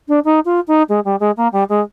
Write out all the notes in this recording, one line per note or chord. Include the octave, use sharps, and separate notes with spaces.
D4
D#4
F4
D#4
G#3
G3
G#3
A#3
G3
G#3